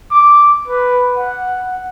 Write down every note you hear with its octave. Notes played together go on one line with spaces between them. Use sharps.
D6
B4
F#5